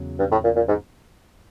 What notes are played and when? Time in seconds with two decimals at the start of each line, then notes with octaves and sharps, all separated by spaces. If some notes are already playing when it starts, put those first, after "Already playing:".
Already playing: E2 C#3 F#3
0.19 G2
0.31 A2
0.44 A#2
0.56 A#2
0.68 G#2